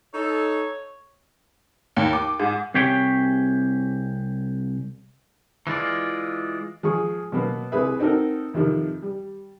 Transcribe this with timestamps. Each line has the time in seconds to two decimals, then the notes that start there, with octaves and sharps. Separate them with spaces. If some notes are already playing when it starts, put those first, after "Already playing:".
0.14 D#4 A4 C#5
1.96 D#2
2.13 D6
2.40 G#2
2.74 C2 C3 G4 G#4 C#5 G5
5.67 E3 G#3 F4 D5
6.83 F3 G#3 G#4 C#6
7.32 B2 F#3 A#3 B3
7.72 C2 G#4 B4 E5
7.99 C4 D#4 F#4 A4 A#4
8.54 F2 C3 D#3 F3
9.02 G3